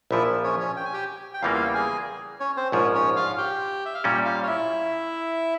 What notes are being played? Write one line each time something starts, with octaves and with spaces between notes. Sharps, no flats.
A#1 A#2 F3 E4 E5
C#4 C#5
C#4 C#5
G5
G#5
G4 G5
G5
E2 C#3 E3 G3 A#3 F4 F5
F5
G5
G#4 G#5
C#4 C#5
C4 C5
A#1 G#2 F3 C#4 C#5
C#4 C#5
F4 F5
G4 G5
E5
F5
A#2 G3 C#4 G4 G5
F4 F5
C#5
E4 E5